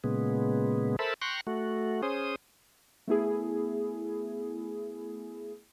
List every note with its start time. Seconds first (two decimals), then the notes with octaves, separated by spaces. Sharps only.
0.04 A#2 C#3 G#3 B3
0.99 A4 A#4 C5 E5 A5 B5
1.22 G5 A#5 C6 C#6 F#6
1.47 A3 F#4
2.03 C#4 G#4 C5 D#6
3.08 A3 B3 E4 G#4